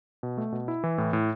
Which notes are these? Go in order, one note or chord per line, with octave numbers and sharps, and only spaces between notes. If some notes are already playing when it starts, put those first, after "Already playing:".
B2
A3
B2
E4
E3
A2
A2